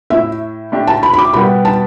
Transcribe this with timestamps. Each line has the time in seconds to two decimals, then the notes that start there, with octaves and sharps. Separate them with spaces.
0.10 A2 A3 E4 E5
0.72 A2 A3 D4 G4
0.87 A5
1.03 B5
1.13 B5
1.18 D6
1.33 B2 G3 B3 G4 B5
1.65 A5